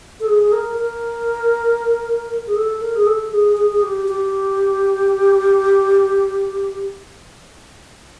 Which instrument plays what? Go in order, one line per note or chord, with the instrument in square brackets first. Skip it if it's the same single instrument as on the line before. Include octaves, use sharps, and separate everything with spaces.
[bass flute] A4
G#4
A#4
A#4
G#4
A4
A#4
G#4
A4
G#4
G#4
G#4
G4
G4